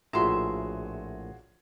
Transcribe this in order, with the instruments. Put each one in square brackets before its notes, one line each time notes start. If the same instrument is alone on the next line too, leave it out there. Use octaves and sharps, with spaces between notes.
[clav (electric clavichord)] A#1 A2 A#5 [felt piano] F4 F#4 G#4 [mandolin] E5 C6